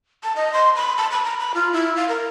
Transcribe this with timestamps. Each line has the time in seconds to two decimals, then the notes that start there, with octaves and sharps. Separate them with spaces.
0.24 A5
0.36 D#5
0.54 C6
0.76 B5
0.98 A5
1.11 B5
1.25 A#5
1.40 B5
1.55 F4
1.73 E4
1.96 F5
2.09 A#4